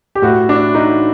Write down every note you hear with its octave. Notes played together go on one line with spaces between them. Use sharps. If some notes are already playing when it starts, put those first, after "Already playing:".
G4
A2 F#4
D4
D#4